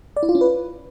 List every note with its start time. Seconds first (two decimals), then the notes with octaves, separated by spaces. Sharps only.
0.16 D5
0.23 E4
0.29 F4
0.35 C#4
0.41 B4